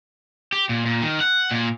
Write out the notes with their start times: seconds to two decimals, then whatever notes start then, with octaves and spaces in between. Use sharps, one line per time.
0.53 G4
0.69 A#2
0.86 A#2
1.02 D#3
1.21 F#5
1.51 A#2